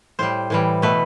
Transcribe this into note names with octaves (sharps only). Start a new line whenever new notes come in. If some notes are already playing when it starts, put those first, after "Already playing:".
A2 G3 C5
A2 E3 G3
B2 A3 B4